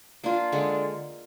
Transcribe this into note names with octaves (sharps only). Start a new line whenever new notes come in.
A#3 D4 F4
D3 G#3 D4